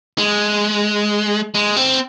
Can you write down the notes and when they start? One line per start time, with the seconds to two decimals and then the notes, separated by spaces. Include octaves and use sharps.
0.18 G#3
1.55 G#3
1.76 C4